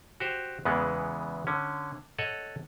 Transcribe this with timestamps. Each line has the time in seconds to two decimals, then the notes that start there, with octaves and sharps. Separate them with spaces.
0.20 F#4 G4 C5
0.65 E2 C#3 E3 G#3 B3
1.47 D3 C#4
2.18 A4 C#5 D#5 F#5